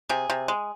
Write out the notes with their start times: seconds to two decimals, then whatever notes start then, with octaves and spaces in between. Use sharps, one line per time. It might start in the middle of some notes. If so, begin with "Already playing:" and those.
0.09 C3 G#4
0.30 C3
0.48 G#3